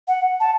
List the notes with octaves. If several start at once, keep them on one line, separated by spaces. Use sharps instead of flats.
F#5
A5